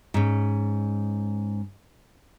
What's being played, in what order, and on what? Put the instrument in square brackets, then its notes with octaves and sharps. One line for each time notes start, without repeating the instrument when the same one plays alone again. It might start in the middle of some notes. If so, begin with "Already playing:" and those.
[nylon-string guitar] G#2 C#4